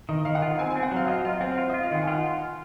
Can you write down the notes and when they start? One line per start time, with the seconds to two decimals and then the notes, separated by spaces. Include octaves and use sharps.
0.09 D#3 D#5
0.25 D#3 F5
0.35 F#5
0.42 F4 F5
0.59 C4 G#5
0.70 G#5
0.76 C4
0.83 F#5
0.91 F#3 F5
1.08 F4 D#5
1.25 F4 F5
1.41 C4 F#5
1.58 F4 F5
1.70 D#5
1.74 F4
1.83 F5
1.91 D#3 F#5
2.03 G#5
2.07 F4 F#5